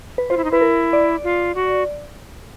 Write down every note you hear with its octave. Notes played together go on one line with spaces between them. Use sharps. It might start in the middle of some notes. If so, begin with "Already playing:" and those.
B4
F4 C5
E4
D#4
E4 B4
A#4
D5
F4
F#4